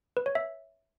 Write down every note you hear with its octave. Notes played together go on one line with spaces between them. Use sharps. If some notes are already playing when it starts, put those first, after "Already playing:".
B4
C#5
E5